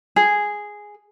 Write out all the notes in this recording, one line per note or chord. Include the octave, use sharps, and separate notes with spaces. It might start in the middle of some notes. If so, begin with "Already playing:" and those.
G#4